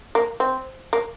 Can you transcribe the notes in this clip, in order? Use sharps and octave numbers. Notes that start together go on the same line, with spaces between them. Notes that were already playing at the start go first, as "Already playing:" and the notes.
A#3
C4
A#3